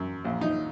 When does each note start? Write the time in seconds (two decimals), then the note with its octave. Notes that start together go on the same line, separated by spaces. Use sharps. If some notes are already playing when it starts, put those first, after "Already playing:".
Already playing: F#2
0.25 A#1
0.41 D#4